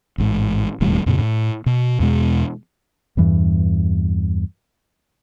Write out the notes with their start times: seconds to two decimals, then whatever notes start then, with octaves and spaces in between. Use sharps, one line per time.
0.18 A1 G#2
0.81 E1 D#2 A2 G3
1.06 F2 A#2 C#3
1.19 A2
1.66 B2
2.00 E2 B2 G#3
3.17 E2 G2 E3